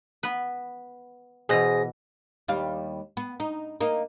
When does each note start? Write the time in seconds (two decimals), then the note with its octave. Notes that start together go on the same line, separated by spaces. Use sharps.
0.23 B3 B4
1.49 B2 E3 G#4 C5 A#6
2.48 D#2 G3 F5
3.17 B3
3.40 D#4
3.81 A#3 D#4